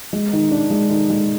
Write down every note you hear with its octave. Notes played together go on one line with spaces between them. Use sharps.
G#3
D#3
D4
G#3
D#3
G#3